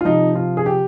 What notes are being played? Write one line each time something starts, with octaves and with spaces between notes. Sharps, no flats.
F4
C3 F3 D#4
F4
G#4
G4